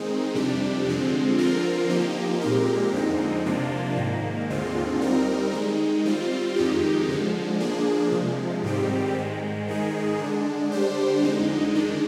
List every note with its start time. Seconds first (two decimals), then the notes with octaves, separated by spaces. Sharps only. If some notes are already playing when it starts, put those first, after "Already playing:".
Already playing: D#3 G#3 C4 D#4
0.34 F2 C3 G3 D4 G4
0.86 D3 F3 G#3 C4
1.38 D3 F3 C4 F4 A#4
1.90 F3 A#3 D#4 G4
2.41 A#2 G#3 C4 G4 A#4
2.94 F2 D3 G#3 C4 D#4
3.46 C3 F3 A#3 D4 F4
3.97 G#2 D#3 A#3
4.49 D#2 D3 G#3 C4 F4
5.01 G3 C4 D#4 A#4
5.53 D#3 G#3 D#4
6.05 G3 C4 F4
6.56 F2 D#3 G#3 D#4 G4
7.09 D3 F3 G#3
7.60 F3 A#3 D4 G#4
8.12 C3 F3 G#3
8.63 G#2 D#3 G3 C4 G4
9.16 G#2 D#3 G#3
9.67 G#2 D#3 G#3 D#4 G#4
10.20 D3 G#3 D4
10.72 D3 G3 D4 G4 C5
11.23 F2 D3 G#3 D#4
11.75 D#3 G#3 D4